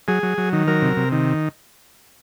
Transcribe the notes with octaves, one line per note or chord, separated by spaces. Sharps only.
F#3 G#4
F#3
F#3
D#3
F#3 A#4
C3
C3
D#3